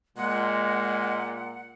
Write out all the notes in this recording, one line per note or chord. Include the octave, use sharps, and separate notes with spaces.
A#2 G#3 F#5